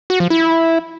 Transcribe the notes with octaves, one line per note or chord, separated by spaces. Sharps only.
F#4
F3
E4